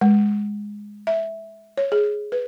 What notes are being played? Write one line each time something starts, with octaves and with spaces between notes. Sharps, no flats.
G#3
E5
C#5
G#4
B4